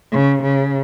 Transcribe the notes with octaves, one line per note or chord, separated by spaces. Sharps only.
C#3
C#3